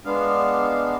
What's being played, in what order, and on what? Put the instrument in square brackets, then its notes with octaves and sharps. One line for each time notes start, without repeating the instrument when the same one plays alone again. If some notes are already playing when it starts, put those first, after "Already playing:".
[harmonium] G#3 B3 D4 F5